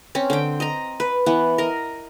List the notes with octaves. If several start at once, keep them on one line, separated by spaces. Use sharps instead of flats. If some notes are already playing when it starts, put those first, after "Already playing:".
C4 C#4
D3 G5
D#5 A#5
B4
E3 B3 F#5
A#4 D#5